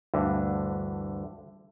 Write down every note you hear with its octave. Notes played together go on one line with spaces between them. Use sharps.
D2 G2 D3 E3